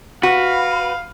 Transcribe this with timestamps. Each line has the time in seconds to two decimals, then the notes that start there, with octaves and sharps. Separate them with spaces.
0.23 F#4 B4 F5